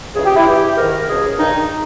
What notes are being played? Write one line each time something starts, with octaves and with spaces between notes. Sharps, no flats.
C#2 C#3 E3 G#4
G4
E4
G2 E3 G4
G#2 D#3 A#4
C#2 B2 G#4
G2 D#3 D#4